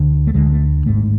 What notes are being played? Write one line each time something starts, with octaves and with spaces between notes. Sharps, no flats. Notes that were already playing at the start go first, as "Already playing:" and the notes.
Already playing: D2 D3
A3
D2 D3 G#3
A3
G#1 G#2 A3